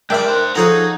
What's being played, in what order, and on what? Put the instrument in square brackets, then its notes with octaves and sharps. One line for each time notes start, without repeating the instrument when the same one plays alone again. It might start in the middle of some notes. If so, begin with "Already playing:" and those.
[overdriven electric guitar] G3 G#3 [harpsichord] D4 D5 [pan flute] A#4 [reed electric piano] E5 G5
[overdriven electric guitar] C5 F#5
[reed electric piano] F3 F#6 [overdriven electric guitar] D#4 A#5 [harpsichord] F#4 G#4 C#5 [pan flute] A4